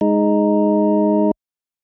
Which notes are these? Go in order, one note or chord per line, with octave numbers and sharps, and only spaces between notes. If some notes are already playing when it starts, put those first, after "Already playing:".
G#3 D#4